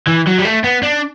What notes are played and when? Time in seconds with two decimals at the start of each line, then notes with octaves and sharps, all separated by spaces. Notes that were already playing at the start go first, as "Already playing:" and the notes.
0.07 E3
0.27 F#3
0.39 G3
0.45 A3
0.64 B3
0.83 D4